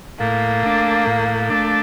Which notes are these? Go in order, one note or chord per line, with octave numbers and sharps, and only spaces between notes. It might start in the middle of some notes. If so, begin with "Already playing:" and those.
A2 A#3
A3 D4
A2
A3 D4